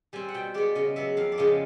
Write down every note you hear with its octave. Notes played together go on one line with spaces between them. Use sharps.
G3 C4 G#5
F#5
B2 G5
G#3 B3 D5
C#3 D#5
F#3 B3 E5
F2 F5
D5
C#3 F3 G#3 B3 D#5